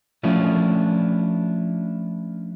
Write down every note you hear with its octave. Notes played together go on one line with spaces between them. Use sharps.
F3 A3 C#4 D4 E4 F4